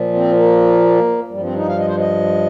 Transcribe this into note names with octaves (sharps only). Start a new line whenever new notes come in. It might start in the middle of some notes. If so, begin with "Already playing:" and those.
Already playing: A#2 F3
C4
A#3
G2 F3 G3
C4
D#4
F5
D#5
C5
D#5